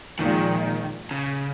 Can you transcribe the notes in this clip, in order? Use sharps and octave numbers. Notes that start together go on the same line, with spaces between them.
A#2 D#3 F3 G#3
C#3